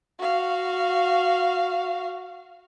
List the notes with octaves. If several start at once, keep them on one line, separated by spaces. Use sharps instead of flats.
F#4 F5